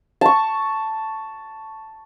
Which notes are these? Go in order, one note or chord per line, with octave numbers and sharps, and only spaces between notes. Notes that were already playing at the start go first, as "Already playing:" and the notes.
A5 C#6